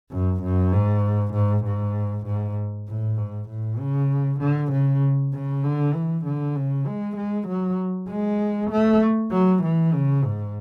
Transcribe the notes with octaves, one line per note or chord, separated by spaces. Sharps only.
F#2
F#2
G#2
G#2
G#2
G#2
A2
G#2
A2
C#3
D3
C#3
C#3
D3
E3
D3
C#3
G#3
G#3
F#3
G#3
A3
F#3
E3
C#3
G#2